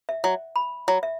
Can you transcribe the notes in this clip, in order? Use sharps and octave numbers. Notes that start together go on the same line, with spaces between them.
E5
F#3
B5
F#3
E5